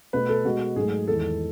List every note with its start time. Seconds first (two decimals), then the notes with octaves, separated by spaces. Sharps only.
0.13 B2 A3 B4
0.29 A4
0.45 B2 G#3 F#4
0.76 G#2 F#3 A3 G#4
1.08 E2 D#3 G#3 A4